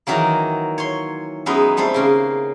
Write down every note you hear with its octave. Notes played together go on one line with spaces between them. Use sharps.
D#3 E3 F#3 A#3
C#5 C6
F#2 G#3 B3 D#4 E5
G3 A3 C4 C5
C#3 A#3